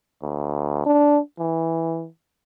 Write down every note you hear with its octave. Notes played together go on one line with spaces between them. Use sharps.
D2
D4
E3